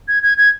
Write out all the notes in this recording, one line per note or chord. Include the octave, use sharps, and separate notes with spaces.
G#6
G#6
G#6